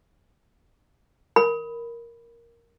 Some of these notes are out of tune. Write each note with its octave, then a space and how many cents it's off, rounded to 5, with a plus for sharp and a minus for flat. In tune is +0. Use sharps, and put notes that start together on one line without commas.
A#4 +0 B5 +0